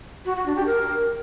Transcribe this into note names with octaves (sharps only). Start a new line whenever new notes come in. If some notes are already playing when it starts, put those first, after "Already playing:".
F#4
F#4
D4
G4
A#4